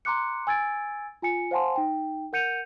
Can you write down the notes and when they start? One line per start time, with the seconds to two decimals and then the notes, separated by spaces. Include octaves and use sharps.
0.05 A#5 C6 D6 F#6 C#7
0.47 G#5 E6 G#6 A6 D7
1.22 F4 G#5 C#7
1.51 C5 F5 F#5 G#5 A5 C6
1.76 D#4 G5
2.33 A#4 F#5 G6 C#7 D#7 F7